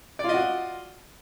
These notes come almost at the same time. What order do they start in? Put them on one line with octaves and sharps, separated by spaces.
D5 F4 D#5 F#4